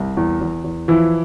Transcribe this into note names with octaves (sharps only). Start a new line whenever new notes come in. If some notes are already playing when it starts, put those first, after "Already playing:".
Already playing: C2
E2
E2
E2
E3 F3 E4